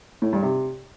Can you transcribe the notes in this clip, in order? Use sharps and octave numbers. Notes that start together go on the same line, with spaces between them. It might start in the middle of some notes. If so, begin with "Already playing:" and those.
A2
G2
C3